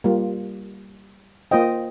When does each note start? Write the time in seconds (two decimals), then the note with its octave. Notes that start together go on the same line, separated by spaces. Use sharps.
0.04 G3 A#3 F4
1.51 A#3 F4 C5 D#5 G5